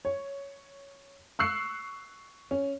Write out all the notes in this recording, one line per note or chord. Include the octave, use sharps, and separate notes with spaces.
C#5
C#6 E6 F#6 C7 C#7
C#4